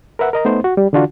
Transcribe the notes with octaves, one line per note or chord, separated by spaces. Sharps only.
A#4 B4 E5 F#5
A#4 D#5 A#5
A3 B3 D#4 C5
F#4
G3
D3 E3 D4 F4 F#4